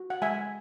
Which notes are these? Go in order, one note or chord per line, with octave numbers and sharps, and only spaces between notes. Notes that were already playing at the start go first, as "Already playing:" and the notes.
Already playing: F#4
F#5
G#3 E5 G#5